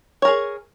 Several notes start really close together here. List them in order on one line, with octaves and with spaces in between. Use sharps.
C#5 A#4 G#4